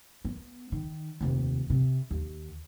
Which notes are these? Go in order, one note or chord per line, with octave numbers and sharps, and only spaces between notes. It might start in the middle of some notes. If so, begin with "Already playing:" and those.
B3
D#3
F1 D#2
C3
D#2